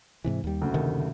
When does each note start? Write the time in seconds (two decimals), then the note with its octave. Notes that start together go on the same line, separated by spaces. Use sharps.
0.24 G#2 C3 E3
0.44 D#2 G3
0.62 F#1 D2
0.74 C3 D#3 A3